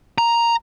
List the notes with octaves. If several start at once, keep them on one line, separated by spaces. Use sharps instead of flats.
A#5